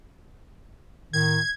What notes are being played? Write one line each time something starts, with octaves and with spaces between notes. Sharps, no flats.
A2 D#3 G#6